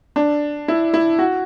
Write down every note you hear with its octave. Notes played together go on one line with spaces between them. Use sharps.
D4
E4
E4
F#4